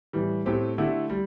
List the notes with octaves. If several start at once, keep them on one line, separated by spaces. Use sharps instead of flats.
A2 E3 G3
A2 A3 C4 G4
D3 A3 E4 G4
G3